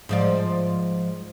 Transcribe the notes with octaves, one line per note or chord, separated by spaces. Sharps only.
G#2 F3 D5